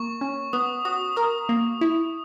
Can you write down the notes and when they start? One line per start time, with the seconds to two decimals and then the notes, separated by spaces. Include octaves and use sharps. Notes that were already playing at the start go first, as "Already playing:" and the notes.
Already playing: A#3 C#6
0.21 C#4
0.53 B3 D#6
0.85 F#4 D#6
1.17 A#4 D#6
1.49 A#3
1.81 E4